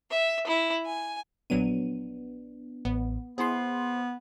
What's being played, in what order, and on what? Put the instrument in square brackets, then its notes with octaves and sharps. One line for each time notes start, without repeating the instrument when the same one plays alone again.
[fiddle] E5
E4
G#5
[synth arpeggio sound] A#1 F#3 D#7 [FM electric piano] B3 D4
[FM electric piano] A1 [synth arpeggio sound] B3
[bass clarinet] B3 [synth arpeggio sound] E4 G#4 [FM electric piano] C5 C6